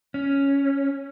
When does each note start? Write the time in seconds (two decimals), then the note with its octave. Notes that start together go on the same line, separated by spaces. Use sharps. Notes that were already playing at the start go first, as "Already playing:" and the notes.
0.14 C#4